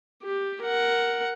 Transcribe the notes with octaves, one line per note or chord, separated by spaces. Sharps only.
G4
A#4 F#5